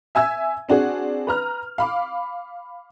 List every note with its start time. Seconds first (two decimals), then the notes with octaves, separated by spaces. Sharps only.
0.15 E5 G#5 E6 G#6
0.69 C4 D4 F#4 G#4
1.27 B4 A#5 F6
1.78 F5 B5 D6